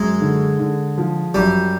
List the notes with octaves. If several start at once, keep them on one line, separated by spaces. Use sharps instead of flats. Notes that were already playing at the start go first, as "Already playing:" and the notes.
Already playing: F#2 G#3
D3
D3
F3
F#2 G3